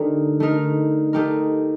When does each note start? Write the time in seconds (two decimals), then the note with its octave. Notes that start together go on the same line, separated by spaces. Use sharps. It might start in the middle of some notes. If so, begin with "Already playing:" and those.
Already playing: D3 A3 D#4 G4 A#4
0.40 A3 D#4 A#4
1.13 A3 D#4 G4 A#4